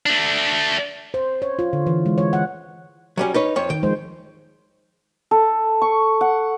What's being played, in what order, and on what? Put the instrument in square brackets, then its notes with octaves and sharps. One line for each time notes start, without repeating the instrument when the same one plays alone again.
[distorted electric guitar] A3 D4
[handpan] C5
C#5
F4
D3
E3
G#3
C#5
F#5
[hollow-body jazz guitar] F#3 G3 C#4
D#4 B4 C#5
F2 C#5
[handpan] D#3 [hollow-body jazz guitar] G5
[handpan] F3 G#3 C5
[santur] A4
C#6
F#5